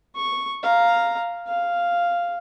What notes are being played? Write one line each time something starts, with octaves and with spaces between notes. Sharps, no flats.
C#6
F5 A#5
F5